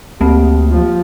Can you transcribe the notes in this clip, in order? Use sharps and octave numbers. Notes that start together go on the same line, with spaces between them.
D2 A#3 C4 G4
F3